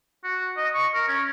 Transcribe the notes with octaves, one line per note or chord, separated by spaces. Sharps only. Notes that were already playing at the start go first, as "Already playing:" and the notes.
F#4
D#5
C#6
A#4
C#4